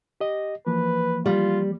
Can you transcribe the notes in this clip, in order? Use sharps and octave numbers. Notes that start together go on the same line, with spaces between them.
G4 D#5
E3 F3 A#3 B4
G3 F4